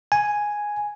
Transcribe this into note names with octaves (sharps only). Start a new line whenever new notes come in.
G#5